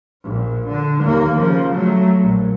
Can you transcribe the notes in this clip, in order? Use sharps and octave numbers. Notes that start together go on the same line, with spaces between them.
A#1
D3
D#2 A#3
C#3 F3
F#3 A3
A#1